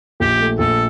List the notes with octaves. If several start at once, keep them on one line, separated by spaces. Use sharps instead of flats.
A#1 G4
A3
A#1 A4